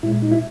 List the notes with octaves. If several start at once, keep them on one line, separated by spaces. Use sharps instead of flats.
A#2 G#3 E4
D#4
E4